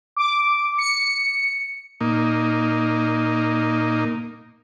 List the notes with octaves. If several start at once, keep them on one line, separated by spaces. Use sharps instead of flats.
D6
C#7
A#2 A#3 D#4